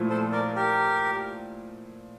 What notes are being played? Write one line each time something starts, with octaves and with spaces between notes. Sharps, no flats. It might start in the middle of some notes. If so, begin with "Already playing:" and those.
Already playing: A#2 F3 A3 E4
A4 C5
A#4 D5
G4 A#4